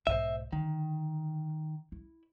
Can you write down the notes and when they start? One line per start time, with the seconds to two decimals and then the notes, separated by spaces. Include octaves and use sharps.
0.07 B1 G#2 C5 D#5 E5
0.52 D3 D#3
1.92 E4